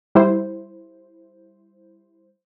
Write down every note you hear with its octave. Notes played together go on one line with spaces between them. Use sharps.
G3 E4 C5